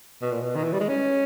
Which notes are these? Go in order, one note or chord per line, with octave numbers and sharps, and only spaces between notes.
B2
A#2
B2
D#3
E3
G3
G#3
C#4